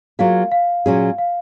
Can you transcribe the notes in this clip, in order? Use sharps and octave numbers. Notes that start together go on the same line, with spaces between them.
F#3 A#3 F4 G#4 F5
F5
A#2 F#3 C#4 G#4
F5